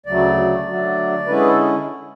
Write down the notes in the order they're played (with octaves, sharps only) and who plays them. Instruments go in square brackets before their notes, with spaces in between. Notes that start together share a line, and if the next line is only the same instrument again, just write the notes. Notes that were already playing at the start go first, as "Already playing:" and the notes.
[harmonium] D2 C#3 F#3 A3 D5
D3 F#3 A3 D4
D3 G#3 C#4 E4 B4
G#4
A4